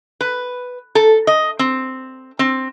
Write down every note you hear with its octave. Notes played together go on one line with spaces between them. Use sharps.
B4
A4
D#5
C4
C4